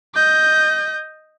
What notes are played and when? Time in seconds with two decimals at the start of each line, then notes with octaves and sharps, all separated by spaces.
0.15 D#5 G6